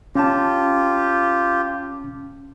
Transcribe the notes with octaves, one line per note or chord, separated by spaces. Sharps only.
C#4 F4 G4 A5